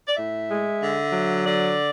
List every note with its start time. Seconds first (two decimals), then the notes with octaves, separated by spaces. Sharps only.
0.07 D5
0.16 A2 E5
0.49 G#3
0.81 D3
1.12 F#3
1.46 D3 D5